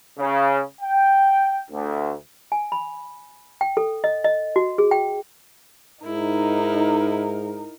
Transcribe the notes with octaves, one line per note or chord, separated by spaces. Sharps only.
C#3
G5
D2
G#5
B5
G5
A4
D#5
D#5
F#4
G#4
G5
G#2 D#4 E4 A#4